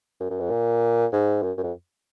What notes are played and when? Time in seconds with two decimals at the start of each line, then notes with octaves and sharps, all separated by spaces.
0.20 F#2
0.31 F#2
0.40 F2
0.51 A#2
1.12 G#2
1.43 F#2
1.58 F#2
1.63 F2